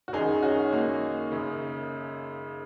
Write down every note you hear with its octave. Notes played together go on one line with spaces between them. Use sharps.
F#4
F#2 D#3 D#4 G#4
C#4 F#4
A#3 D#4
F#2 C#3